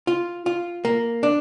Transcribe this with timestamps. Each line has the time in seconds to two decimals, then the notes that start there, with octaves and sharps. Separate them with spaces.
0.07 F4
0.46 F4
0.85 A#3
1.23 D4